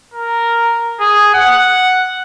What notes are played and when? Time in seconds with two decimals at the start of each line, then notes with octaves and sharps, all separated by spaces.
0.14 A#4
1.00 G#4
1.34 F#5